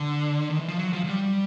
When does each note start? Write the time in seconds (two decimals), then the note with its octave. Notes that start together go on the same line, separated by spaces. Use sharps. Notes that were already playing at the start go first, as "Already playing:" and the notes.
Already playing: D3
0.50 D#3
0.60 E3
0.68 F3
0.79 F#3
0.93 F3
1.04 F#3
1.09 G3